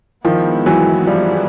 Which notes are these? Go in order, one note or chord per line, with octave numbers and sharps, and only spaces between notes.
D#3 F3 G#3 B3 E4
E3 F#3
F3 G3